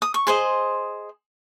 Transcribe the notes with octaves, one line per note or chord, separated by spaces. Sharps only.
D#6
C#6
G#4 C5 D#5 C6